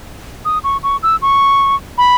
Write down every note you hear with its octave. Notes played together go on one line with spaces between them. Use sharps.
D#6
C#6
C#6
E6
C#6
B5